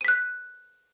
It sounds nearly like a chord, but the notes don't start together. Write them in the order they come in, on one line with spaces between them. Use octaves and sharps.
D#7 B6 F#6